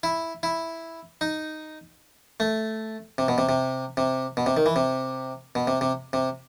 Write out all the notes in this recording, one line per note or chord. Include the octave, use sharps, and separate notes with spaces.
E4
E4
D#4
A3
C3
B2
C3
C3
C3
B2
C3
D#3
E3
C3
B2
C3
C3
C3